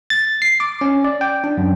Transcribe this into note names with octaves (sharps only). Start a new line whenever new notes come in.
A6
C7
D6
C#4
D5
G5
D4
F#2